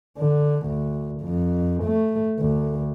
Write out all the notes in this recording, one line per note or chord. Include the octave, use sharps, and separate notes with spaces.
D3
D2
F2
A3
D2